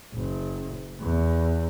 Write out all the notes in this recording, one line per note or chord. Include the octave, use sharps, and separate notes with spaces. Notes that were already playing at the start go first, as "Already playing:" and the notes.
F#1
E2